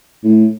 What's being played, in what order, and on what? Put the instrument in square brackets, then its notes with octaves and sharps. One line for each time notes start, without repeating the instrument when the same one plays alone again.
[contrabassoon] A2